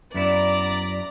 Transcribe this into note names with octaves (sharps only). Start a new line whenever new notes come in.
F#2 B3 E4 D5 A#5